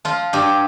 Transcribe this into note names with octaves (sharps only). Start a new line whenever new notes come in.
F3 F4
G2 G4